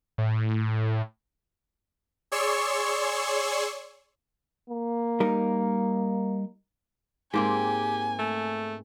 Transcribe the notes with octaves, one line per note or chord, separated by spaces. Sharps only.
A2
G#4 C#5 D5 C6 C#6 E6
A#3
G3 D#4 A#4
G#2 A#3 C4 G4 G#5
A3